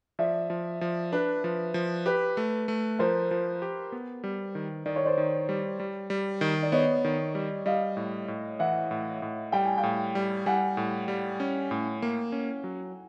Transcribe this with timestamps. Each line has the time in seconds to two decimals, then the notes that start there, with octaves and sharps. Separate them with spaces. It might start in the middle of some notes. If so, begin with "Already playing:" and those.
0.19 F3 D5 E5
0.50 F3
0.81 F3
1.12 D4 B4
1.44 F3
1.74 F3
2.06 G4 B4
2.37 A3
2.68 A3
2.99 F3 A#4 C5
3.31 F3
3.62 G4
3.92 B3
4.24 G3
4.55 D#3
4.86 D#3 D5
4.96 C#5
5.05 C5 D5
5.17 D#3
5.49 G3
5.80 G3
6.10 G3
6.41 D#3
6.63 D5
6.72 B3 C#5 D#5
7.05 D#3
7.35 G3
7.66 G3 D#5 F5
7.97 A2
8.28 A2
8.59 E3 E5 F#5
8.91 A2
9.22 A2
9.52 G3 G5
9.65 G#5
9.77 F5 G5
9.83 A2
10.15 G3
10.46 G3 F#5 G#5
10.77 A2
11.08 G3
11.40 C#4
11.71 A2
12.02 A#3
12.32 C#4
12.64 F#3